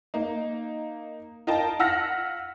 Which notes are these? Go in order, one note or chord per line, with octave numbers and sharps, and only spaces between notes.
A#3 D#4
F4 A#4 D#5 G5 A5
F4 F#5 E6 F6 A#6 B6